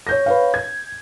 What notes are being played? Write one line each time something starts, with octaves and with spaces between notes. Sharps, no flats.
C#5 G6 A#6
B4 C#5 F5
G#6